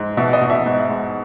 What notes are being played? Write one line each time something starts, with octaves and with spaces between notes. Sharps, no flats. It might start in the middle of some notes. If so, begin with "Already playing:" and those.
Already playing: G#2
B2 E5
D#5
B2
E5
G#2
G#2